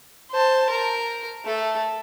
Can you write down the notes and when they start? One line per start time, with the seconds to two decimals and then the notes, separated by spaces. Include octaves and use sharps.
0.31 C5 A5
0.70 A#4
1.46 A3 A4